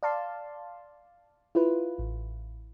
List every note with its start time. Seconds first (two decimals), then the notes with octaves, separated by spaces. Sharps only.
0.03 D5 F5 A5 C6
1.55 E4 F4 B4
1.98 A1